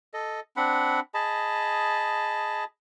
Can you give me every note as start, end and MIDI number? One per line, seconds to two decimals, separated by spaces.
0.14 0.40 69
0.14 0.40 75
0.57 1.00 60
0.57 1.00 62
0.57 1.00 78
0.57 1.00 83
1.14 2.64 68
1.14 2.64 75
1.14 2.64 81
1.14 2.64 83